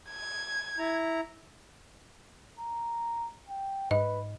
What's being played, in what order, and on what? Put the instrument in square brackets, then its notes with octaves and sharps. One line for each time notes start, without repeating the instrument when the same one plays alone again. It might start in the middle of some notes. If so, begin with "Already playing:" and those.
[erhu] G#6
[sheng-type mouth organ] E4 A#5
[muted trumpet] A#5
G5
[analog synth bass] G#2 [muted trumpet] B4 [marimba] D#5